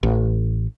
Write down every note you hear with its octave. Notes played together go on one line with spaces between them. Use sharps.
A1